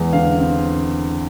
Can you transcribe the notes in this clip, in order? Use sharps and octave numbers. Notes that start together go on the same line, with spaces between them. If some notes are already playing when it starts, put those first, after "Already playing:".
Already playing: E2 G#3
D3 F5
C4